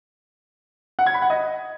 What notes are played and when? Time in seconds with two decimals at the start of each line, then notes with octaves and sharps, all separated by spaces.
0.99 F#5
1.06 G#6
1.14 B5
1.22 F#5
1.30 D#5